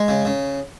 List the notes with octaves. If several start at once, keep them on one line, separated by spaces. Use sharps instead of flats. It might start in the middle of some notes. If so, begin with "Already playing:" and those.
Already playing: G#3
C#3
C#3